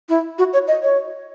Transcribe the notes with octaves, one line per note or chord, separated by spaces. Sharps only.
E4
F#4
C#5
D#5
C#5